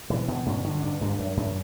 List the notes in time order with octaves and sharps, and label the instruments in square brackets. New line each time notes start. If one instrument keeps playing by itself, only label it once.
[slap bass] B2 E3
B2
G2 C#4
D3
G2 D4
G2
F#2
F#2